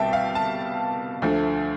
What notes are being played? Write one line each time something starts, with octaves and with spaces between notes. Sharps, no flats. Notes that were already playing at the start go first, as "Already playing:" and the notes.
Already playing: C2 B2 G3 E5 G5 A5
F5
A5
D2 D3 F3 A3